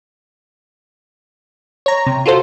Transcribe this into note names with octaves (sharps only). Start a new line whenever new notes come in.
C#5 A#5
C3
F4 F#4 A4 C5